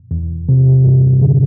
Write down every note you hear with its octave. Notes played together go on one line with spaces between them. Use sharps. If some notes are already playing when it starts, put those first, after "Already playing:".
E2
C3
G2
D3